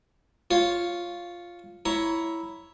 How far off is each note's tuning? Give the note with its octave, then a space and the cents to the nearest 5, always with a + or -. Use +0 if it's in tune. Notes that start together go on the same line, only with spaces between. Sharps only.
F4 +0 C#5 +0
E4 +0 C#5 +10 A#5 +10